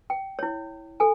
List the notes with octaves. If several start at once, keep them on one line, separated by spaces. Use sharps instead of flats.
G5
E4 C#5
A4 G#5